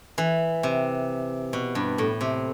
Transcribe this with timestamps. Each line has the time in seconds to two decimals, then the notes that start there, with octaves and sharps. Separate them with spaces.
0.18 E3
0.63 C3
1.53 B2
1.75 G2
1.98 A2
2.21 C3